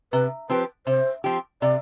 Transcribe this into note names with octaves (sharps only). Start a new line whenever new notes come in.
C3 B4
F3 C4 G4 B4
C3 C5
F3 C4 G4
C3 D5